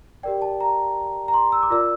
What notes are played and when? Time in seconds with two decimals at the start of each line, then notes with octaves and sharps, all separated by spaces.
0.23 G4 A#4 D5 G5
0.42 A5
0.60 A#5
1.28 A#5
1.34 C6
1.52 E6
1.63 D6
1.70 F4 A#4 D5 E6